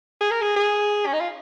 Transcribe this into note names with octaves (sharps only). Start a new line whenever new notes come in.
G#4
A#4
G#4
G#4
C#4
D#4
F4